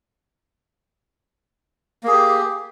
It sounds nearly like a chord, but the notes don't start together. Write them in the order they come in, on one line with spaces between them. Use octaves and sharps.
A#3 G#4 G4